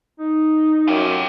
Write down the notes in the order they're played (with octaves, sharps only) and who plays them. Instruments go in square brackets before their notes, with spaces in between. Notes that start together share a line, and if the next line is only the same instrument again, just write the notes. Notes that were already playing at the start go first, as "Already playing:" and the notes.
[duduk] D#4
[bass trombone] F#2 [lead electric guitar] F4 G4